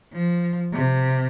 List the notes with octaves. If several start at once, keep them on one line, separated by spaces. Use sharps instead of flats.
F3
C3